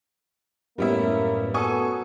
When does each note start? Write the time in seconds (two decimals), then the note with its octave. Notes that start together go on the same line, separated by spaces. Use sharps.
0.78 F#2 A2 G3 A#3 B3 E4 E5
1.54 F#3 B3 A4 G#5 C#6 D#6